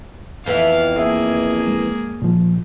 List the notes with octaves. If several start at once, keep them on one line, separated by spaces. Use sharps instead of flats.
F2 E3 B3 F5
A#3 G#4 E5
G#3
A#2 F3